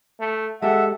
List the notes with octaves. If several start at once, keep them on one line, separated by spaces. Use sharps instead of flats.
A3
G#3 G4 A4 E5 F#5